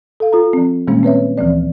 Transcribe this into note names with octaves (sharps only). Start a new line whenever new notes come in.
A4 F5
F4 A4 A#5
F3 C4
A#2 D#3 G3 G#3 A#3 C#4
C4 B4 C#5 E5
D2 E3 F3 C4 D5